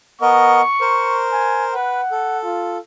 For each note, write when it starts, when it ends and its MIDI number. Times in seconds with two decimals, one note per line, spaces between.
0.21 0.61 59
0.21 0.61 70
0.21 0.61 75
0.21 1.23 85
0.81 1.74 70
0.81 1.74 72
1.33 1.65 80
1.74 2.01 71
1.74 2.39 78
2.11 2.78 69
2.44 2.78 65